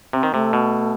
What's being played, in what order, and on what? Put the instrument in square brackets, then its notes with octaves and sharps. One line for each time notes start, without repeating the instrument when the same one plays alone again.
[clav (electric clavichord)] C3 [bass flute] C4
[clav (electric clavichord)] D#3
[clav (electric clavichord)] C3 [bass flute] A3
[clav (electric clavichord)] B2